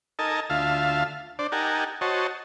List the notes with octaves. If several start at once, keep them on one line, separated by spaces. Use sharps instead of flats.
D#4 A4 A#4 D#5 G#5 A5
D2 F4 E5 F5 A5
D4 C5 D5
D#4 G4 A#4 F#5 G#5 A5
F#4 C5 C#5 D#5 A5